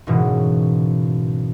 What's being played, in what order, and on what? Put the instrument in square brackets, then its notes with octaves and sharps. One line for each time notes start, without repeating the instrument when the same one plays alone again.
[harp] F#1 G#2 B2 E3